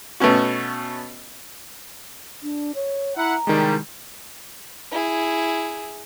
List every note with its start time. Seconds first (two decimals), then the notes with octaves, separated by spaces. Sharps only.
0.20 B2 A3 B3 C#4 F#4
2.43 D4
2.75 C#5
3.17 E4 E5 F#5 A#5
3.47 C2 D#3 G3 G#3
4.92 E4 G#4